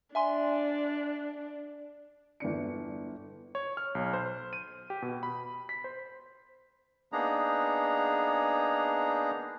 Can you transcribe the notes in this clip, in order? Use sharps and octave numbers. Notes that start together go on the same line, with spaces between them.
D4 E5 G#5 C6
G1 E2 D4 C#7
C#5
F6
B1
C5
D#7
G4
B2
B5
B6
C5
A#3 B3 D4 D#4 G#4 A#5